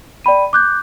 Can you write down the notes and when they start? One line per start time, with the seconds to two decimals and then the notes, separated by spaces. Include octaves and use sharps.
0.24 D5 G5 B5 D#7
0.53 D6 F#6 G6